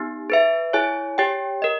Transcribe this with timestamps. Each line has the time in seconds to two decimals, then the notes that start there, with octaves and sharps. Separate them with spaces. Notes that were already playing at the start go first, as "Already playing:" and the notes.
Already playing: B3 D#4 G4
0.30 G#4 B4 E5
0.73 E4 G#4 C#5 G#5
1.18 G4 C#5 G5
1.62 A#4 D#5